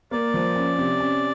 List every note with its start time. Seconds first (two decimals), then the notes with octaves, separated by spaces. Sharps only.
0.11 A#3 D5
0.34 F3
0.56 C#4
0.78 C3
1.00 C#4